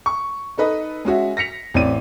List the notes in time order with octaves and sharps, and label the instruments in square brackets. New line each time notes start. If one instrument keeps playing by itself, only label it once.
[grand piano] C#6
D#4 A4 B4 D#5
G#3 C#4 F#4 E5
A#6 B6 C#7 F7
A1 C4 D5 D#7